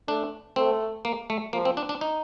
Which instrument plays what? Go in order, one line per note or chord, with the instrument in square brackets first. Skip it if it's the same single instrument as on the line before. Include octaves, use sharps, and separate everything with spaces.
[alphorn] A3 [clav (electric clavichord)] D4
[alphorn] A3 [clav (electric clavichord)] C4
[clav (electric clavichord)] A#3
A3
[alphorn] F3 [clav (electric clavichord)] A#3
[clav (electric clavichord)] C4
D4
D4
D#4